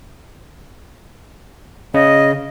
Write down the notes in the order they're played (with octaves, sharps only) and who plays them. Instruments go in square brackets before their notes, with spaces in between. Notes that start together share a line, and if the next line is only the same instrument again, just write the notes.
[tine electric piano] C#3 [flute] D#5